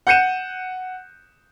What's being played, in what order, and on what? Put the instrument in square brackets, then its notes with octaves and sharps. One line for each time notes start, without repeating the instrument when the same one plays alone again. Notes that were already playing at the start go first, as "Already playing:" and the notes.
[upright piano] F#5 F#6 G6 C#7 D#7 E7